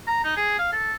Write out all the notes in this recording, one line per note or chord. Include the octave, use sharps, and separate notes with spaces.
A#5
D#4
G#4
F5
A4